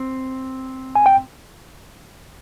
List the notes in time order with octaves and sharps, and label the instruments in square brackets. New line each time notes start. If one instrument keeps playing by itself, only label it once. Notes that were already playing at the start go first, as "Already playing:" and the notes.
Already playing: [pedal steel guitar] C4
[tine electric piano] G#5
G5